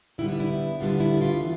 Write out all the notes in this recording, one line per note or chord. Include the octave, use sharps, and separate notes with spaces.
D3 G3 B3 E4
D4
E4
D3 G3 B3 F4
E4
F4
E3 A3